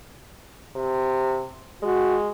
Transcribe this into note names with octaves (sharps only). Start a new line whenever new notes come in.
C3
G#3 F#4